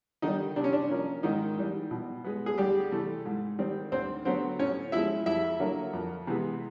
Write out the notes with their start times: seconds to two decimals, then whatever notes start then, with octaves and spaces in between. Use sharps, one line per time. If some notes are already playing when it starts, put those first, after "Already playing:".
0.22 D3 D#3 D#4
0.28 G3
0.56 C3 D4
0.64 C#4
0.73 D4
0.90 F3 A#3 C#4
1.23 G#2 D#3 D#4
1.58 E3 G3
1.91 B2
2.24 G#3 B3
2.46 G#4
2.58 D2 G3 G4
2.91 C3 E3 A3
3.26 G#2
3.59 D#3 G3 C4
3.92 D2 C4 C5
4.25 D3 F#3 B3 C4 C5
4.59 A2 C#4 C#5
4.92 F3 G#3 E4 E5
5.26 F2 E4 E5
5.60 D3 F#3 A#3
5.93 F2
6.27 C3 E3 G#3 B3